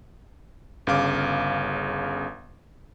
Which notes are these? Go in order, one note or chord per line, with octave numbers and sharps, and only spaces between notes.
G1 C#3 F5 D6